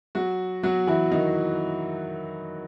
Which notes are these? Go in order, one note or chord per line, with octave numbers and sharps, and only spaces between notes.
F#3 F#4
F#3 F#4
E3 E4
D#3 D#4